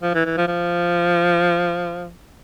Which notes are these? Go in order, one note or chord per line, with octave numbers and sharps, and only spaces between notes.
F3
E3
E3
F3
F3